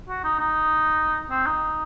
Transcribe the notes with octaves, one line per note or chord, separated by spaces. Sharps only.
F#4
D#4
D#4
C4
D#4